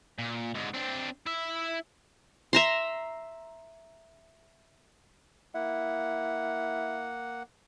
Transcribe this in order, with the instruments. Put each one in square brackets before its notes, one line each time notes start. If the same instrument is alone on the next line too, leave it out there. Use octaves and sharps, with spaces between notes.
[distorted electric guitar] A#2
G#2 D3
C4 D4
E4 E5
[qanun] E5 A#5 C6
[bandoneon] A#3 F#5 [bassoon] E4